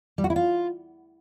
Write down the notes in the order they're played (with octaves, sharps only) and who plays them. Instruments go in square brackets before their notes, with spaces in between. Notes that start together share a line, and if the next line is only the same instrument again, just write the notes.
[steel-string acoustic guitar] G3
F#4
E4
F4